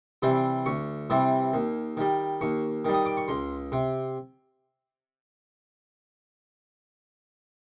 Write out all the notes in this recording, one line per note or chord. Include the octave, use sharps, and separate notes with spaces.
C3 E3 G3 C4
D2 C#6
C3 E3 G3 C4
D#2
D#3 G3
D#2 C#6
D#3 G3
D#6
D6
C#6
C#2 C6
C3